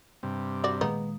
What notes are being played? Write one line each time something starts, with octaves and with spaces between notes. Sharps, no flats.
G2 C3
G3 F#4 D5
A#2 D#3 G#3 B3 D#4